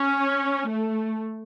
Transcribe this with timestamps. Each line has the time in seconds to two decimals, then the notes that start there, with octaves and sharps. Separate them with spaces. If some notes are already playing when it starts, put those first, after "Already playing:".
Already playing: C#4
0.68 A3